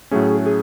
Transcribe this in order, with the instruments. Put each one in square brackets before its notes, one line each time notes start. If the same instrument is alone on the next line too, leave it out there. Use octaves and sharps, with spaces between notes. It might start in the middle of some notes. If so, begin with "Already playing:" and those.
[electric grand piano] A2 F#3 A3 C#4 [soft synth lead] G#4
[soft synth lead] G#4